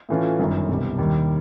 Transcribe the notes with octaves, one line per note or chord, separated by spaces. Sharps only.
A2 E3 A3 C#4 F4
G1 F#2 D#3
C2 B2 G3
D#2 D#3 G3